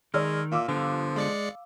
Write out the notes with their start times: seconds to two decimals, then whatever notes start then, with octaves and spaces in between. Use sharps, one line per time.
0.14 D#3 G#3 D5 E6 F6
0.52 A#2 F5 D6 E6
0.68 D3 F3 B3
1.16 G#3 D5 C#7